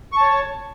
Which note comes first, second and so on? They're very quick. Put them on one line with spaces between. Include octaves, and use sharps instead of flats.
C#6 A5 C#5